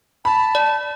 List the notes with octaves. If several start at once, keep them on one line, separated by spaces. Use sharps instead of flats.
A5 B5
D5